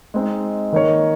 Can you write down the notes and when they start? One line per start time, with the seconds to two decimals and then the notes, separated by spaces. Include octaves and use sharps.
0.14 G#3 C4 D#4
0.72 D#3 A#3 D#4 A#4 C#5